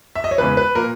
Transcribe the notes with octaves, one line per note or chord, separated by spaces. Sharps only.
E5
D#5
C#5
E2 C#3 G#3 B4
B4
A#2 A#3 A#4